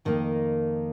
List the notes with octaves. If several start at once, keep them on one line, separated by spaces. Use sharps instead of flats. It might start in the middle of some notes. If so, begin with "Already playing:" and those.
F2 D#3 A#3 D#4